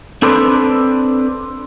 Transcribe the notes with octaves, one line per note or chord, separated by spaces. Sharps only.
C4 D4 A4 B4 C5 D5